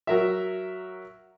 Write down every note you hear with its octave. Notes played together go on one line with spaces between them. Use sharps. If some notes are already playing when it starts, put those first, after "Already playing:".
F#3 A#4 E5